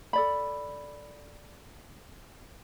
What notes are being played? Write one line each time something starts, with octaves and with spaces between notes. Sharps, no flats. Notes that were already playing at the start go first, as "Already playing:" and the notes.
A4 D5 B5